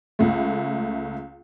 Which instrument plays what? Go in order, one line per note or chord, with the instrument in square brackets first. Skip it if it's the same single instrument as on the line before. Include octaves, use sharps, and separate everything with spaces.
[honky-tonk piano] C#2 A3